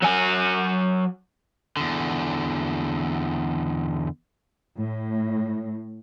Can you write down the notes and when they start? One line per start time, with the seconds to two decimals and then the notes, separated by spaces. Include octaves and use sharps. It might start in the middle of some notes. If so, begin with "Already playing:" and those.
0.02 F#3 G#5
1.77 E2 D3
4.76 A2